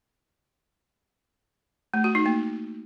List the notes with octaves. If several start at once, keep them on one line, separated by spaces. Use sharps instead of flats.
A3
F#4
D#4
A#3